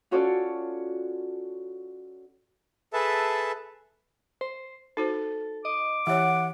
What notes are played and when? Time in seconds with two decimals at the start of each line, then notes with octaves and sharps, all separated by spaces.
0.11 C#4 F4 F#4 A4 C#5 D5
2.93 G#4 A4 B4 E5 A5
4.41 C5
4.97 D#4 F#4 A4 C5
5.65 D#5 D6
6.07 E3 G4 C#5 F#5